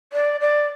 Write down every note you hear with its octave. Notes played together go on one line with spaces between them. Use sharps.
D5
D5